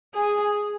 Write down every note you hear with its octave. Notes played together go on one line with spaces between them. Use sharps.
G#4